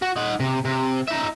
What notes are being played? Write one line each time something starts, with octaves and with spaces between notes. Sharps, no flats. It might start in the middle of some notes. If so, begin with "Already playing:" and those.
F#4
D#4 F#5
C3
C3
D#4 E5